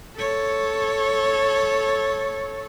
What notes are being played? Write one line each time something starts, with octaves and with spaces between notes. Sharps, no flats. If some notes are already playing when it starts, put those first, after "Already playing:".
A4 C#5